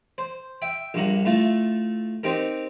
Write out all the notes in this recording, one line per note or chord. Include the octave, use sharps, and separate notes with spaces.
C5
E5 G5
A#1 G2 F#5 A#5
A2 A3 F4
C4 D#4 G4 A#4